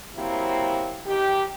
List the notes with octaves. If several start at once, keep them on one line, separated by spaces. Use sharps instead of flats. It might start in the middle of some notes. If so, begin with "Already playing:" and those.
C3 F#3 A#3 C4 E4
D#3 G4